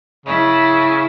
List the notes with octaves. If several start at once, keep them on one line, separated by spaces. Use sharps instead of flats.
C#3 E4